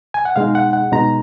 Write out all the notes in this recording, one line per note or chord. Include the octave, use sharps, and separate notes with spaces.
G#5
F#5
B2 G#3 D#4 F5
F#5
F#5
B2 G#3 D#4 A#5